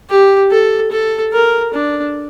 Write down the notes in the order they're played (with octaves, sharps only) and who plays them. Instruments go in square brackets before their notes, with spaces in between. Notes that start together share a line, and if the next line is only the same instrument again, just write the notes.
[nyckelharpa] G4
A4
A4
A#4
D4